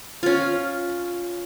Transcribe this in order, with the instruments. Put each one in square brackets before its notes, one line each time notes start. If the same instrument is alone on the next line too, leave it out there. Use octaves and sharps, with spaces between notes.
[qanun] C#4 F4